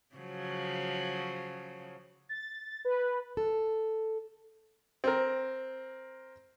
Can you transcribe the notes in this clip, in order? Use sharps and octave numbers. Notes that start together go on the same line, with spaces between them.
C#3 F3 F#3
A6
B4
A4
C4 A#4